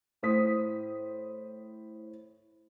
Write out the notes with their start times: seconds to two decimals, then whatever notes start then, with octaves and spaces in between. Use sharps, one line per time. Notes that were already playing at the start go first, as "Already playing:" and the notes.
0.23 A2 C5 D#6 B6